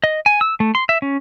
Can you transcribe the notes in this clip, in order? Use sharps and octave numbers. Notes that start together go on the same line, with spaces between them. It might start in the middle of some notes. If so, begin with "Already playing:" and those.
D#5
G#5
E6
A3
C6
E5
C#4